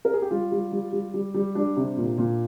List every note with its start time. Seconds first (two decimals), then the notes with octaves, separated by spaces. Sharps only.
0.05 A#4
0.14 G#4
0.22 G4
0.31 G3 F4
0.52 G3
0.72 G3
0.93 G3
1.14 G3
1.34 G3
1.55 G3 D4
1.77 C3
1.97 A#2
2.18 A#2